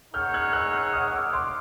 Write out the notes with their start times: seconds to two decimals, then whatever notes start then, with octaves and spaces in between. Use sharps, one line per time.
0.13 D#4 G#4 C#5 F#5 F6 G6
0.34 F#6 G#6
0.53 E6 F#6
0.73 E6 F#6
0.92 D#6 F6
1.13 D6 E6
1.33 C6 D6